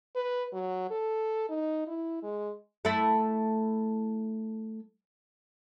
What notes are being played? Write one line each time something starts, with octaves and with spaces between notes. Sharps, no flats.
B4
F#3
A4
D#4
E4
G#3
A3 E4